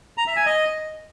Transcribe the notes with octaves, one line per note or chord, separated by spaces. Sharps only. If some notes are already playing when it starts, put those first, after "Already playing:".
A#5
E5
G#5
D#5